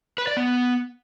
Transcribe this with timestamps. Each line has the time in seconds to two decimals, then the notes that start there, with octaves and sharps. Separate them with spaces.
0.18 B4
0.27 D5
0.37 B3